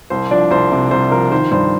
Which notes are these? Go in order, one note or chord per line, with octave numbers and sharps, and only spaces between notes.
C2 C5
F3 D4 D5
C2 C5
C3
C2 C5
F3 A#4
D#3 C5
G2 C5